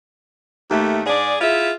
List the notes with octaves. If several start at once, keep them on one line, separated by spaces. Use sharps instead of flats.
D#2 A3
G#2 G#4 D5
E4 F4 G#4 E5